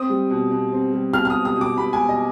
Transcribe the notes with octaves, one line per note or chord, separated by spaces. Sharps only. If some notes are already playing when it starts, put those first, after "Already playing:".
Already playing: C4 D#6
G3
B2
B2
C4
G3
B2 F6
F6
D#6
B2
D#6
B2
D6
B2 B5
G#5
B2
D#5